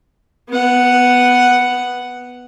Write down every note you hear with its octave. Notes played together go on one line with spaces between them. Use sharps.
B3 F#5